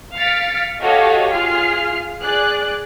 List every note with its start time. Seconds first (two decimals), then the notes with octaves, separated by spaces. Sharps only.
0.16 F5 F6 A6 B6 C#7 D7
0.82 F#4 G4 A4 C#5 D#5 F5
1.32 F4 G#4 F6 C7
2.23 G#4 D5 F#6